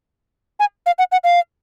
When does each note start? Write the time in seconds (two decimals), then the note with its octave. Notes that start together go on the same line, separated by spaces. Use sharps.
0.60 G#5
0.86 F5
0.98 F#5
1.12 F#5
1.24 F5